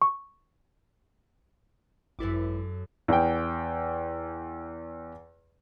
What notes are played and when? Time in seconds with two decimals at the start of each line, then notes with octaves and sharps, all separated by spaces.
0.02 C#6
2.19 G#1 F#2 E4 A4 B4 D6
3.08 E2 G5